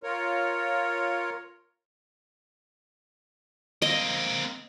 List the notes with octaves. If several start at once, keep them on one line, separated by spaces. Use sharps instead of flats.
F4 A#4 C#5
A#3 C4 D#5